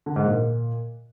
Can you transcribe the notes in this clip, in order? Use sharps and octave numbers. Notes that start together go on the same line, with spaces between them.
D3
G#2
A#2